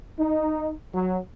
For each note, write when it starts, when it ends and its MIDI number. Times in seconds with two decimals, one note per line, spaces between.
0.19 0.71 63
0.94 1.18 54